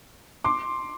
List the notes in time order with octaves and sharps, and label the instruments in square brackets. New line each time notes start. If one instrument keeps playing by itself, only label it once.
[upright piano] C6 D6